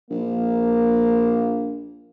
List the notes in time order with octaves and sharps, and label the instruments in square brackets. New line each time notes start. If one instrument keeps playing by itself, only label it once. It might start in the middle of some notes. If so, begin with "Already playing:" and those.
[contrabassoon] A#1 [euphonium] A#3